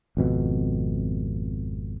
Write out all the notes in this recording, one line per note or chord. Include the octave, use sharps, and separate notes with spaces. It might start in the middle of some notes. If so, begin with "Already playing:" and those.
G#1 F2 B2